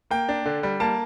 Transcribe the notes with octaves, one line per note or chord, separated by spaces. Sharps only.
A#3 G5
D4
D3
G3
A#3 A5